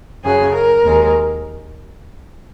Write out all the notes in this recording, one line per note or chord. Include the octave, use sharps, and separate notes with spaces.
F#2 C#3 F#3 G#4
A#4
D#2 D#3 G#3